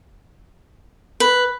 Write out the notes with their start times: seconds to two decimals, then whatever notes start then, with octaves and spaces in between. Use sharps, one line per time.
1.20 B4